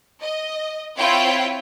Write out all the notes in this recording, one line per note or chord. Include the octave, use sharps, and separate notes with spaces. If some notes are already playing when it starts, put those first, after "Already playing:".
D#5
C4 E4 F4 C#5 G5